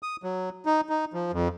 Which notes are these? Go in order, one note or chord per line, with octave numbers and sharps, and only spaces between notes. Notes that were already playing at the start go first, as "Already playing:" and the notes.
D#6
F#3
D#4
D#4
F3
F2